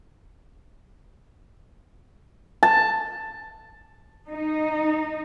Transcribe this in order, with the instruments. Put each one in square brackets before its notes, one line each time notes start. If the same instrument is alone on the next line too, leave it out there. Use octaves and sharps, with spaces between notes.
[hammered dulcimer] A5
[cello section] D#4